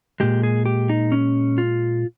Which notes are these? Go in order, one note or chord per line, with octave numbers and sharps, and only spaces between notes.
A#2 G#3 G4
G#4
G4
D#4
C#4
F4